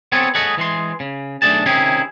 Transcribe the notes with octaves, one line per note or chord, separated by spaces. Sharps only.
B3 C4 G#4 A4 B4 C#5
G#4 A4 B4 C#5 D#5 F#5
E3 G#3 C6
C#3
B1 G#2 A3 D4 G#4 A5
C3 D#3 C#4 E4 G4 G#4